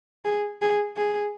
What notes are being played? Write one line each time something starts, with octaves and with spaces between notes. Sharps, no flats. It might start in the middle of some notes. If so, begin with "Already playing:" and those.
G#4
G#4
G#4